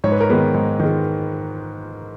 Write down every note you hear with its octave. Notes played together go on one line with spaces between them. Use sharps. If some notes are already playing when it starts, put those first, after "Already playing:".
G#2 C#5
B4
A#4
D#3 G#3 B3 B4
G#2
D#3 G#3